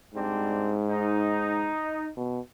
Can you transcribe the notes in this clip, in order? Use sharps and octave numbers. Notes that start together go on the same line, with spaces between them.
G#2 G3 C4 D4
D#4
B2